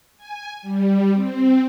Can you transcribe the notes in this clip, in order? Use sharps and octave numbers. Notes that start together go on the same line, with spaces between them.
G#5
G3
C4